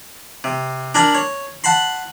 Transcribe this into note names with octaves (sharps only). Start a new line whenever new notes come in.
C3
D4 A#4 G#5 B5
C#5
F#5 A5 B5 C6